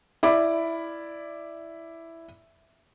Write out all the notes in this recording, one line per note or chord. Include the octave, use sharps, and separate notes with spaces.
E4 D5 B5 D6